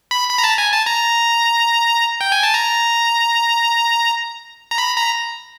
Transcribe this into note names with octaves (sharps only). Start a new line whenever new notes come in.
B5
B5
A#5
A5
G#5
A5
A#5
G5
G#5
A5
A#5
A#5
B5
A#5